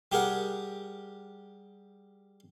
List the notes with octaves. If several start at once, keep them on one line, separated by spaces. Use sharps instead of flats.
G3 G4 G#4 A#4 F#5